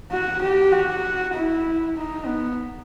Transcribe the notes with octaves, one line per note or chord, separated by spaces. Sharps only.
F#4
G4
F#4
E4
D#4
B3